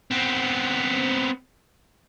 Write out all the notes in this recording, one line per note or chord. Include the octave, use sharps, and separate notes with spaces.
B3 C4